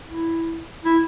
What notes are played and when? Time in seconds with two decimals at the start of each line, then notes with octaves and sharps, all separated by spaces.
0.08 E4
0.85 E4